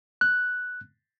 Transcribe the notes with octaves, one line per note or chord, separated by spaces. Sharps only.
F#6